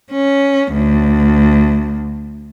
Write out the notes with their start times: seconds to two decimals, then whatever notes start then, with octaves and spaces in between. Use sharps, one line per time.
0.12 C#4
0.73 D2